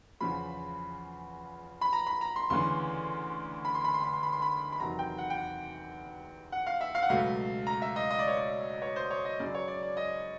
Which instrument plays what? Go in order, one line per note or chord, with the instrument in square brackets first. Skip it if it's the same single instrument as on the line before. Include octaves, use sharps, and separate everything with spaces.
[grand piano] E2 C#3 F3 B5
B5
A#5
B5
A#5
C6
D2 C#3 E3 C6
B5
C6
B5
C6
B5
C6
B5
C6
B5
B5
E2 C3 D#3 F#3 A#5
G5
F#5
G5
F#5
F#5
F5
E5
F5
F#5
C#2 B2 F#3 A3 F5
A#5
E5
D#5
D#5
D5
C#5
D5
C#5
C5
C#5
D#5
F#2 C#3 F#3 D5
C#5
D5
D5
D#5